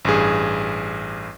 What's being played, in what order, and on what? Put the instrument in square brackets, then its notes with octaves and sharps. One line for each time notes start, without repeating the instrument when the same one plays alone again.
[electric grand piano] A1 G2 G#4